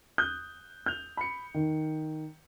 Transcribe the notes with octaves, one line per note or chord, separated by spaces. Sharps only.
D#6 F#6 G6
G6 F7
B5 C#7
D#3